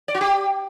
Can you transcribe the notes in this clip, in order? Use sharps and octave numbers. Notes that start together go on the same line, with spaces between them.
D5
F#4
G4